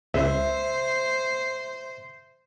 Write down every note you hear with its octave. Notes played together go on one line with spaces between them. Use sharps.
C#2 C5 E5